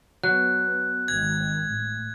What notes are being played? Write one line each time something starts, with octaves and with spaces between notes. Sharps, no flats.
F#3 B3 F#6
G#1 D#3 G#6
A2